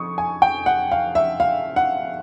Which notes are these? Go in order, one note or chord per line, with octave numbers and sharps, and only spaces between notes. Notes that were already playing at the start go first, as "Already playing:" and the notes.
Already playing: F2 C#6 D#6
G#5
G5
F#5
F5
E5
F5
F#5